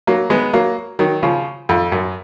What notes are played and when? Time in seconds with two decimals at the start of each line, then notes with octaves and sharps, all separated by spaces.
0.07 F#3 A#3
0.30 G#3 B3
0.54 F#3 A#3
0.99 D#3 F#3
1.23 C#3 F3
1.69 F2
1.92 F#2